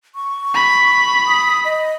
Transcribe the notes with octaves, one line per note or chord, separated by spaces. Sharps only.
C#6
B5
D#6
D#5